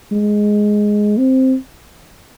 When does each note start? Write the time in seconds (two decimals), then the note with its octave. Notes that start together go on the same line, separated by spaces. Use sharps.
0.12 G#3
1.18 C4